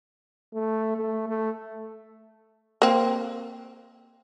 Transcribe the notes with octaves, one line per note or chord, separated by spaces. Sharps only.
A3
A3
A3
A#3 C4